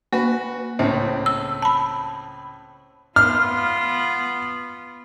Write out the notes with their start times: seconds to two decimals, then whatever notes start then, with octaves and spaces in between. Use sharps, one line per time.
0.13 A#3 F#4 B4
0.79 C#2 A2 C4
1.26 E6
1.62 A5 B5
3.16 B3 F4 F6